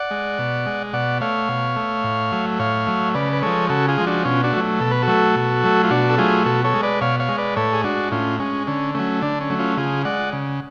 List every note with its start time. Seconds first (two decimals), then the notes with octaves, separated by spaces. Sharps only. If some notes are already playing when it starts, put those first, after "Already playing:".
Already playing: D5 F#5
0.11 G#3
0.39 B2
0.66 G#3
0.93 B2 D5 F#5
1.21 A3 C#5 F5
1.49 B2
1.76 A3
2.04 A2
2.32 F#3 A3
2.59 A2 C#5 F5
2.87 F#3 A3
3.15 C#3 B4 D5
3.33 B4
3.42 F3 G#3 A4 C#5
3.70 C#3 F#4 A4
3.88 F4 G#4
3.98 F3 G#3
4.06 D4 F#4
4.25 B2 C#4 F4
4.44 D4 F#4
4.53 F#3 A3
4.80 B2 A4
4.91 B4
5.02 F#4 A4
5.08 F#3 A3
5.36 B2
5.64 F#3 A3
5.84 F4
5.91 B2 D4 F#4
6.10 A4
6.18 F#3 A3 F4 G#4
6.46 B2 F#4 A4
6.64 A4 C#5
6.74 G#3
6.83 B4 D5
7.01 B2 C#5 F5
7.20 C#5 F5
7.29 G#3
7.38 B4 D5
7.56 A2 A4 C#5
7.73 G#4
7.84 G#3 D4 F#4
8.12 A2 C#4 F4
8.39 G#3 C#4
8.67 D3 C#4
8.95 F#3 A3 C#4
9.22 D3 D4
9.41 C#4
9.50 F#3 A3
9.59 C#4 F4
9.77 C#3 F4 G#4
10.05 G#3 D5 F#5
10.33 C#3